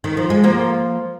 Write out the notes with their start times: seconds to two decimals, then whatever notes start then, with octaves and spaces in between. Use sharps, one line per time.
0.04 D#3
0.17 F3
0.30 G#3
0.44 F3 A#3